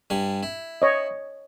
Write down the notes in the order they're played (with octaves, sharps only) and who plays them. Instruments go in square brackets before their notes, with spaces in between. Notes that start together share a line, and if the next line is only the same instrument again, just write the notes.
[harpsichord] G2 G3 G#5
E4
[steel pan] C#5 D#5